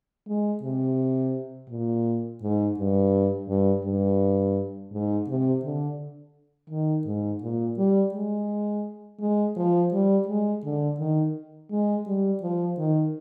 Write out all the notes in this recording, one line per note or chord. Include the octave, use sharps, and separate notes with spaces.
G#3
C3
A#2
G#2
G2
G2
G2
G#2
C3
D3
D#3
G#2
A#2
G3
G#3
G#3
F3
G3
G#3
D3
D#3
G#3
G3
F3
D#3